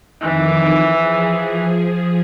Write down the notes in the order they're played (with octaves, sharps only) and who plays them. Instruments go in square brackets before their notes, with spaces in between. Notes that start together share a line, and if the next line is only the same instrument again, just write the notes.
[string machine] F2 D#3 D6 [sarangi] E3
[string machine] F3 G#4